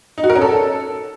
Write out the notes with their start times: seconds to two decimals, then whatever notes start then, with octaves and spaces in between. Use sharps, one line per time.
0.18 D#4
0.24 F#4
0.30 A#4
0.36 C#4
0.42 A4